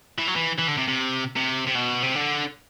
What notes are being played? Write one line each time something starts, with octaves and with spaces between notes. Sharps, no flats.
E3
F#3
E3
E3
D3
C3
C3
C3
C3
B2
C3
D3